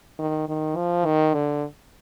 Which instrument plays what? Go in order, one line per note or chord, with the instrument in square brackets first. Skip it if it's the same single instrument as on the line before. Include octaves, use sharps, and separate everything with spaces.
[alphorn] D#3
D#3
F3
D#3
D3